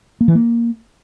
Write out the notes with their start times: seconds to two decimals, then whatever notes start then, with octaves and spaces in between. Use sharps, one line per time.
0.21 A#3
0.28 E3
0.35 A#3